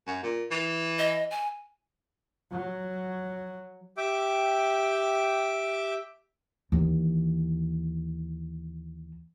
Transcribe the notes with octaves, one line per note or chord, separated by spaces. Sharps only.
F#2
A#2
E3
D#5
G#5
F#3
G4 E5 G5 D6
D#2 E3